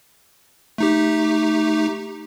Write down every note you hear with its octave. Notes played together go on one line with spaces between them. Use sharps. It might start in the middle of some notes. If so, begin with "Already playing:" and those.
A3 D#4 G4